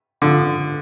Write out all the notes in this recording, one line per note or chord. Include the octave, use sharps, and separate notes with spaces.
D3 F3